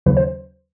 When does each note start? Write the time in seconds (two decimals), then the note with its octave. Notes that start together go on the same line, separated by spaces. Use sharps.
0.06 D#2 C#3 F#3 B4
0.17 C5